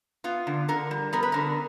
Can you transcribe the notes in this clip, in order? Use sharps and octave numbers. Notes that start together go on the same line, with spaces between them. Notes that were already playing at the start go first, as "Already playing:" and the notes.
B3 F4
D3
D3 A#4
G3
B3 A#4
B4
D3 A#4